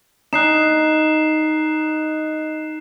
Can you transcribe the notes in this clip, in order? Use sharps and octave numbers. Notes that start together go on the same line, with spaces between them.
D#4 F#6 C7 E7